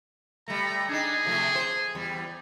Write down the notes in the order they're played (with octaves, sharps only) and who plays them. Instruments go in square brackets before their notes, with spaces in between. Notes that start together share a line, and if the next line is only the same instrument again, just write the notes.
[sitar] G3 A3 [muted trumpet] A#5
[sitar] D4 D#4 [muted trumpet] G#4
[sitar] C3 F3 A3
C5
E2 G3